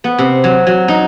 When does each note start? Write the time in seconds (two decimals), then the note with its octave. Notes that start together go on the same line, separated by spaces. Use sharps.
0.04 B3
0.18 C3
0.44 F#3
0.67 F#3
0.88 D#4